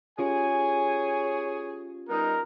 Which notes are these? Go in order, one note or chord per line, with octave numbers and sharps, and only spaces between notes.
C#4 F4 G4 G#4 C#5 G#5
G3 B3 D#4 A#4